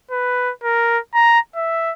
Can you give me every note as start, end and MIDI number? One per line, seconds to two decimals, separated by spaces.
0.11 0.52 71
0.63 0.98 70
1.14 1.39 82
1.56 1.93 76